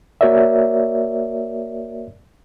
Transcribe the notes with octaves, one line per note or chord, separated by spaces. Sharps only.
A#3 F#4 A#4 C#5 D5 E5